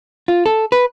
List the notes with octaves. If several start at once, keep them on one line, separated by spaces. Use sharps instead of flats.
F4
A4
B4